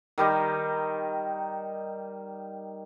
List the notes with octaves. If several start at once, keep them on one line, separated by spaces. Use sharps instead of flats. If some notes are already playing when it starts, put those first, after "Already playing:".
D#3 G3 D#4